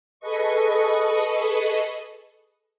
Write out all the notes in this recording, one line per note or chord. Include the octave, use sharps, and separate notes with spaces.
G#4 A4 B4 D#5 C#6